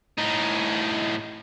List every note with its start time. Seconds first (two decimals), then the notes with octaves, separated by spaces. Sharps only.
0.18 A2 D#4